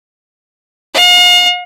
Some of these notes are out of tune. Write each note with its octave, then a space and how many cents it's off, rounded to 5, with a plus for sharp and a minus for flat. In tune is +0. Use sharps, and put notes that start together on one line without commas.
F5 +40